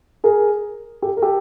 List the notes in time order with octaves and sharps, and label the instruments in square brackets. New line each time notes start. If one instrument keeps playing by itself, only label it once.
[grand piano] G#4 A#4
G4 A4
A#4
G4 A4